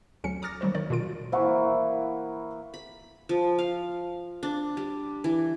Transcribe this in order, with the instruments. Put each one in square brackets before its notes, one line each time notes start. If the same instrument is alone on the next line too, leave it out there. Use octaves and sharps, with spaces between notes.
[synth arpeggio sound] D2 D3 F#3 C#4 C#7
A#5 D6 D#6 F6 A6 A#6
D#3 F#3 G3 F#4 C5
D#3 C#5 D5
B2 D3 D#3 F4 D7
[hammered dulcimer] E3 A#3 E4 [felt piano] C5 F#5 C#6
[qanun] B5
F3
F5
D4
G3
E3